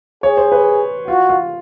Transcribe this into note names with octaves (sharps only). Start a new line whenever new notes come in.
G#4 C#5
C5
B4
F4 F#4
F4